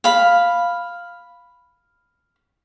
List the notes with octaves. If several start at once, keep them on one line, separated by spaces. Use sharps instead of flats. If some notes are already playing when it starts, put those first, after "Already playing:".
F5 B5